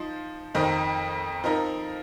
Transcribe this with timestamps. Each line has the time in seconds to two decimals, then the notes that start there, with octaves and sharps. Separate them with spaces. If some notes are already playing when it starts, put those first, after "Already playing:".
Already playing: F3 D#4 C5
0.54 F2 D#3 C4 D#4 A#4
1.44 F3 C4 D#4 A#4